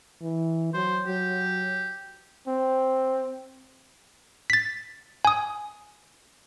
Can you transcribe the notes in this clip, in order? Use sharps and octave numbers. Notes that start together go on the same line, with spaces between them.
E3
F#3 C5
F#3 G4
C4
A6 B6
G#5 D#6